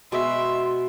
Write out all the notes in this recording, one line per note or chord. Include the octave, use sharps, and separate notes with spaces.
B2 G#3 E5 C6